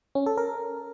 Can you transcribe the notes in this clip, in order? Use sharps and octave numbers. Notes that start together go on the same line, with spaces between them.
C#4
A4
A#4